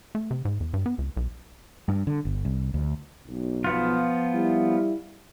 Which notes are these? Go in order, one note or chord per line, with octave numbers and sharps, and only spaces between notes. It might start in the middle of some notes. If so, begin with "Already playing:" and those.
A3
C3
G#2
E2
G2
B3
C#2
B1
G2
D3
G1
C2
D2
B1
F3 B3 F4
G3 E4